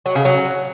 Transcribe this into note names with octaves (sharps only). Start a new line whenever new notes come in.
F#3
C#3
F#3